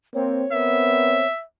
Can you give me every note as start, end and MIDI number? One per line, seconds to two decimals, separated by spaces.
0.14 0.44 58
0.14 0.44 60
0.14 1.26 73
0.52 1.28 59
0.52 1.28 60
0.52 1.28 70
0.52 1.44 76